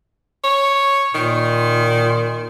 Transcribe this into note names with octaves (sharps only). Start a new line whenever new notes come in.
C#5
A#2 D#3